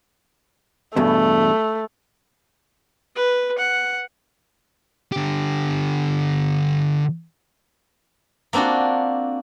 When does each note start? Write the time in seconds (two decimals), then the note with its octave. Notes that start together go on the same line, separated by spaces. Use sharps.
0.96 E2 G2 B2 A3
3.15 B4
3.58 F#5
5.12 D3 G4
8.53 A#3 C4 D4 F4 F#4